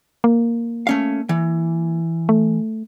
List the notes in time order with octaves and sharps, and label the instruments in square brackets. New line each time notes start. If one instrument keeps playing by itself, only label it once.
[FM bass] A#3
[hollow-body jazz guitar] A3 C#4 F5
E3
[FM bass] A3